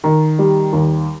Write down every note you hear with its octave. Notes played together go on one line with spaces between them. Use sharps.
D#3
G3
D#2